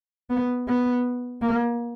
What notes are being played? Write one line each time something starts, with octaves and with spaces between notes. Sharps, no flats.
B3
B3
A#3